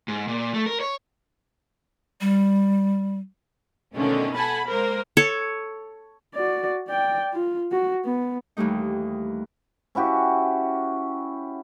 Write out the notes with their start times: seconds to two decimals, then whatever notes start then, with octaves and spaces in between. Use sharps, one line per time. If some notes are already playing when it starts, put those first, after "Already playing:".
0.08 G#2
0.28 A#2
0.54 A3
0.66 A#4
0.80 C#5
2.21 G3
3.96 B2 D3 D#3 G#3 A3 C#4
4.35 A4 F#5 G#5 A5 B5
4.66 G#3 A#3 A#4 C5
5.17 A4 C#5
6.35 F#4 D5
6.88 D5 G5
7.33 F4
7.72 F#4
8.04 B3
8.57 D#2 E3 G3 A3 D#4
9.95 C#4 E4 F#4 G4